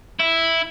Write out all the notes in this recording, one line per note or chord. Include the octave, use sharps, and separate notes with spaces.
E4